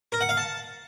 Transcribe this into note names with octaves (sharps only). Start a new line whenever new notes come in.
A#4
F#5
F5
A5